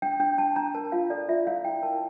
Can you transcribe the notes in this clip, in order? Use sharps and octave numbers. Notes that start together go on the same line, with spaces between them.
D4 G5
D4 G5
D4 A5
D4 A#5
A#4 A5
F4 F5
A4 D5
F4 E5
E4 F5
E4 G5
A#4 A5